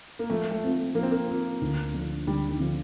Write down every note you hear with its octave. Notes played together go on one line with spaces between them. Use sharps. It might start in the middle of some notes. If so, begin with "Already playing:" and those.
A#3
F3 A3
A3
C4 F4
F3 A#3
C4
A#3
C4 F4
D2
D3 F3
D2 G3
D#3
D3 F3